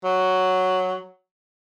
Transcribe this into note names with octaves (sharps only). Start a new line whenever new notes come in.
F#3